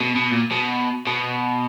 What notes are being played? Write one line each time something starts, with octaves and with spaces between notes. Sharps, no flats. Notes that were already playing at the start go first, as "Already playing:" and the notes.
B2
B2
A#2
B2
B2